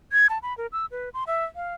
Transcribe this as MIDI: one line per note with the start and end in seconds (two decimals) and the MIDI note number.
0.12 0.27 92
0.30 0.38 81
0.43 0.56 83
0.58 0.67 70
0.73 0.86 88
0.91 1.09 71
1.14 1.24 84
1.27 1.45 76
1.56 1.74 77